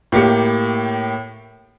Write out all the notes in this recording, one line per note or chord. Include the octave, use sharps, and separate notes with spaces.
A2 A#3 G4 C#7